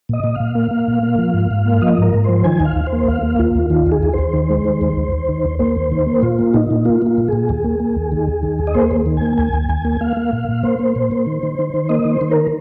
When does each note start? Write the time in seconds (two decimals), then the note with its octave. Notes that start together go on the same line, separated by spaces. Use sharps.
0.09 A#2 D#5
0.24 A#2
0.35 A#2 F5
0.55 A#3
0.71 A#3
0.88 A#2
1.03 A#3
1.18 F3
1.34 G#2
1.51 G#2
1.65 A#3
1.82 F3 D#5
1.98 G#2 A#4
2.14 G#2
2.24 F3 C5
2.44 D#3 G#5
2.60 D#2
2.65 F5
2.76 D#2
2.87 C5
2.93 A#3
3.08 D#2 F5
3.23 A#3
3.39 D#2 F4
3.55 D#2
3.70 D#3 F4
3.86 D#2
3.92 G#4
4.03 D#2
4.13 C5
4.19 D#2
4.33 D#3
4.50 G#3
4.65 D#3
4.81 D#2
4.97 D#2
5.12 D#2
5.29 D#3
5.45 D#2
5.59 A#3 C5
5.76 D#2
5.91 D#3
6.06 A#3
6.22 A#2 F4
6.39 A#3
6.54 A#2 D#4
6.70 A#2
6.85 A#3 F4
7.02 A#3 F4
7.18 A#2
7.28 A#2 G#4
7.49 D#2
7.64 A#3
7.80 A#3
7.96 D#2
8.12 D#3
8.28 D#2
8.43 D#3
8.59 D#2
8.67 D#5
8.74 A#3 C5
8.91 D#2
9.06 D#3
9.17 A#3 G#5
9.38 D#2 G#5
9.53 D#2
9.69 D#2 G#5
9.85 A#3
10.01 A#3 F5
10.17 A#3
10.33 A#2
10.49 A#2
10.63 A#3 C5
10.79 A#3
10.96 A#2
11.11 A#3
11.26 D#3
11.43 D#3
11.59 D#3
11.74 D#3
11.89 A#3 D#5
12.05 D#3
12.11 C5
12.21 D#3
12.31 A#4